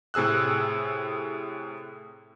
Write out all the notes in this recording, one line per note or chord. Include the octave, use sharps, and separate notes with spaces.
A2 C3 G#4 E6 F#6